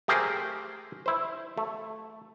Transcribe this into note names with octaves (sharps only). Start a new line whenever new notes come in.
A3 G4 G#4 A#4 C5
E4 C5
A3